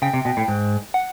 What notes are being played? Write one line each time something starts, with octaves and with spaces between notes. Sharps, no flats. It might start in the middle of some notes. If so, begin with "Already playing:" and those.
C#3 G5
C3
B2
A2
G#2
F#5